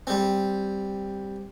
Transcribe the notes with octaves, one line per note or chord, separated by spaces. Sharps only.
G3 C4